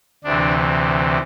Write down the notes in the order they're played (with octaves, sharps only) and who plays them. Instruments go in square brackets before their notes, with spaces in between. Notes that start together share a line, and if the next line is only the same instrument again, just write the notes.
[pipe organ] D2 C3 E3 D4